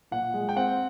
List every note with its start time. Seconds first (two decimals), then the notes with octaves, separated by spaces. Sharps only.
0.11 A#2 F#5
0.34 G#3
0.49 G5
0.56 C4 F#5